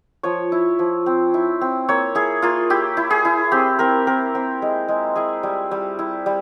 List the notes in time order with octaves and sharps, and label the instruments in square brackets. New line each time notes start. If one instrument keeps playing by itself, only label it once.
[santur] F3 C#5
E4
F3
C4
E4
C4
A#3 C#5
E4 G#4
A#3 F4
E4 G4
E4
G#4
E4
C4 G4
C4 A#4
C4 A#4
C4
G#3
G#3
E4 G#4
G3
G3
E4
G3